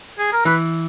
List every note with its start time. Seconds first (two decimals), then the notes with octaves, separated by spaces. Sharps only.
0.19 G#4
0.33 A#4
0.45 E3 B4